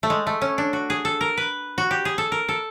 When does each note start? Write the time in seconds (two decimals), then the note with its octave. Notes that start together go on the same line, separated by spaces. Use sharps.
0.03 A3
0.10 G#3
0.27 A3
0.42 C#4
0.58 D4
0.73 F#4
0.90 G#4
1.05 A4
1.21 A#4
1.37 B4
1.78 F#4
1.91 G4
2.05 G#4
2.18 A4
2.32 A#4
2.49 A4